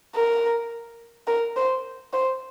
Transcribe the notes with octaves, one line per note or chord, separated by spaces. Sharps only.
A#4
A#4
C5
C5